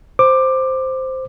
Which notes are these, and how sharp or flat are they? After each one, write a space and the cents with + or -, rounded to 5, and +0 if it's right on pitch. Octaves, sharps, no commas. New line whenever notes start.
C5 +0 D6 +15